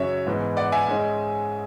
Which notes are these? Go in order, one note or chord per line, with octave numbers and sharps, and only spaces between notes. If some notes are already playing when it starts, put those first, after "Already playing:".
Already playing: F#2 C#3 F#3 C#4 C#5 E5
G#2 E3 B3
D5 F#5
E5 G#5
G#2 G#3 C#4